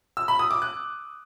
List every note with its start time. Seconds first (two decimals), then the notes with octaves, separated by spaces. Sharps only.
0.17 E6
0.28 B5
0.39 D#6
0.51 D6
0.62 F#6